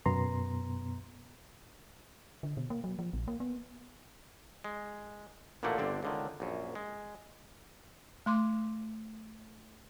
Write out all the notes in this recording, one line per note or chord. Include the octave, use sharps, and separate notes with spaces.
F#2 B2 B3 A#5 C6
D3
B2
A#3
F#3
F3
A#1
A#3
B3
G#3
A1 A#2 D3 A3 A#3 F#5
G1 D3 C4 D5
C#2 D3 D#3
A#1 F#2
G#3
A3 C6 D6